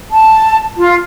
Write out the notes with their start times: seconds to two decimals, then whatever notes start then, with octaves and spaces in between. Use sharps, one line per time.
0.11 A5
0.77 F4